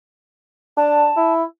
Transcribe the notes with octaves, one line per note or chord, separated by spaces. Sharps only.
D4 A5
E4